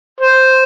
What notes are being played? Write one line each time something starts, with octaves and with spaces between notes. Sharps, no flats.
C5